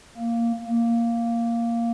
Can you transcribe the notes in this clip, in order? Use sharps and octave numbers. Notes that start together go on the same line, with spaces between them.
A#3
A#3